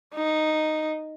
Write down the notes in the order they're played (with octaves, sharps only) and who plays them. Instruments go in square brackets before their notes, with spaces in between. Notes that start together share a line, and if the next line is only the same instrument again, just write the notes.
[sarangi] D#4